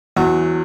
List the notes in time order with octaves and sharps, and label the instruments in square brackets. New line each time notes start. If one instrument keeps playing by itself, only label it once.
[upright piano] E2 [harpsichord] F#3